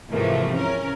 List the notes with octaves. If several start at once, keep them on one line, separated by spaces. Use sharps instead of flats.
G#2 C3 E3 F3 A3 A#3
C#4 A#4